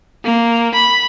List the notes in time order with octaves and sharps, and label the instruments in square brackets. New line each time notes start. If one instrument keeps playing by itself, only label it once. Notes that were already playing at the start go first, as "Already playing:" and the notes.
[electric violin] A#3
B5